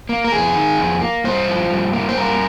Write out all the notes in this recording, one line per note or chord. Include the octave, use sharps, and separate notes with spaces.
A#3
A#4
F2 G#4
D#3
F2
A#3
G2 C5
F3
G2
A#3
C5
G2 A#4